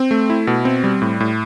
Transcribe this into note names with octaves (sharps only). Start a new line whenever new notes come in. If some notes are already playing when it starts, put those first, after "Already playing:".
Already playing: C4
A3
E4
B2
C4
G3
A2
A2